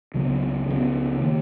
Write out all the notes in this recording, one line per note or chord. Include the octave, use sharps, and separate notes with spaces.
C#2 C#3 F#3 B3
C#2 C#3 F#3 B3
D#3 A#3